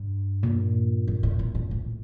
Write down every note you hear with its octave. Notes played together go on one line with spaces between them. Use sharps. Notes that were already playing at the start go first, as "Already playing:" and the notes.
Already playing: G2
A#2
F2
A2
A2
A2
A2